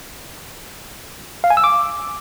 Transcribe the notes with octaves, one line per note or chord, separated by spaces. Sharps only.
F5
G#5
E6
D6